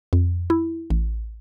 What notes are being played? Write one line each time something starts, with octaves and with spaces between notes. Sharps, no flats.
F2
E4
A1